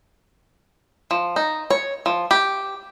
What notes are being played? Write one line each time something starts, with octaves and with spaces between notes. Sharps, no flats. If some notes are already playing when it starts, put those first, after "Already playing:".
F3
D#4
C#5
F3
G4